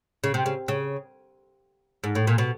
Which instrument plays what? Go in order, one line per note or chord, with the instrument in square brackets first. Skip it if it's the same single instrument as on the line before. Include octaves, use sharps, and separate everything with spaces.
[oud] C#3
C3
C#3
C#3
G#2
A2
A#2
B2